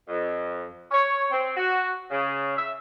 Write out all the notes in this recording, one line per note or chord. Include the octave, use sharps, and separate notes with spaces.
F2
C#5
C4
F#4
C#3
E5